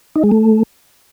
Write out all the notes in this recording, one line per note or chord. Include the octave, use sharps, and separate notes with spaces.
D#4
G#3
A3